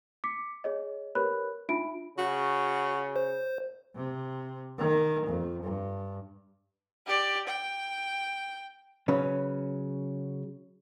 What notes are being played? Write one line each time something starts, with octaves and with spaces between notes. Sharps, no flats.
D6 B6 C#7
G#4 C#5 D#5
G4 A#4 B4 C#5 B5 F#6
D4 D#4 F4 E5 B5 D7
C#3 F#4
C5
C3
D#3
F2
G2
G4 D5
G5
C#3 F#3 C#4 B4